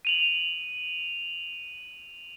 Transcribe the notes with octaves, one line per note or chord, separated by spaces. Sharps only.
D#7 F7 F#7